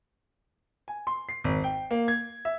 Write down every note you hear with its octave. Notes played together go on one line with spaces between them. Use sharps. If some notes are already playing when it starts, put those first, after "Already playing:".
G#5
C6
C7
G#1
G5
A#3
G#6
E5